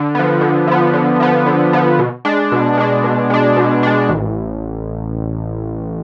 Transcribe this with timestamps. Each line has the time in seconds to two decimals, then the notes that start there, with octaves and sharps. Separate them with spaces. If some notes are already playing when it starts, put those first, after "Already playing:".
Already playing: D3
0.15 F3 B3
0.41 D3
0.67 F3 B3
0.93 D3
1.20 F3 B3
1.46 D3
1.73 F3 B3
1.99 B2
2.25 G#3 D4
2.52 B2
2.78 G#3 D4
3.04 B2
3.30 G#3 D4
3.56 B2
3.83 G#3 D4
4.09 A1